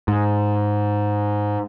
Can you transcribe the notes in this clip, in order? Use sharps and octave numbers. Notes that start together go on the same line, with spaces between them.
G#2